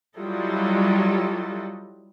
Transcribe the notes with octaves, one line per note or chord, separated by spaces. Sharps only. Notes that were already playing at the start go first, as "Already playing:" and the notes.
F#3 G3 E4 F4 A4 D#5